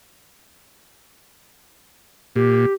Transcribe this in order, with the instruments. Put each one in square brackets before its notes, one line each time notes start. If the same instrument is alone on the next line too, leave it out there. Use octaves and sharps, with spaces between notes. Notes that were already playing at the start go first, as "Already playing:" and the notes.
[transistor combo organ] A#2 [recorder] G4